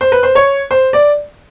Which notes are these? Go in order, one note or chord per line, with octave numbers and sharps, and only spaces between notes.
C5
B4
C5
C#5
C5
D5